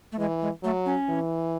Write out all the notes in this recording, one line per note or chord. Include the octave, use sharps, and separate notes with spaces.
A3
E3 G#3
G#3
F#3 A3
C#4
E3